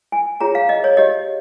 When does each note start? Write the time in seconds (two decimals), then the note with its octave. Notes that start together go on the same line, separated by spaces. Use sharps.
0.12 G#5
0.40 F4 G#4 C#5 A#5
0.55 F5
0.69 D#5
0.84 C#5
0.97 G4 C#5 D#5